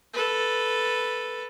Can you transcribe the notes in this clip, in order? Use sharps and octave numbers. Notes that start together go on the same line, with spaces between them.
A4 B4